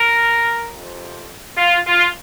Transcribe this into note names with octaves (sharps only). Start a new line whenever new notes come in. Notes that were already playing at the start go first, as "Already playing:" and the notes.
Already playing: A#4
F2 C3 F3
F4
F4